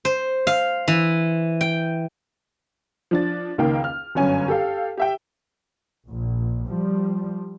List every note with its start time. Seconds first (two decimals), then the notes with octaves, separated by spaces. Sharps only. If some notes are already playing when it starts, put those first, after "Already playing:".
0.05 C5
0.47 F5
0.88 E3
1.61 G5
3.11 F3 D4 A6
3.58 C#2 D#3 A#3 F5 G5
3.84 F6
4.15 G1 F#2 C#4 G#5
4.48 G4 A4 F5
4.97 G4 E5 G5
6.08 A#1
6.65 F3 G3